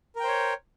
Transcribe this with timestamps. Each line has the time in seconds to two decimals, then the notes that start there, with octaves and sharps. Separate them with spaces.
0.16 A#4
0.20 G5
0.24 C5
0.28 C#5